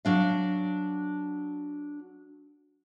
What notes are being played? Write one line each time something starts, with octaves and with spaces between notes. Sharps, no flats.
F#3 D4 F5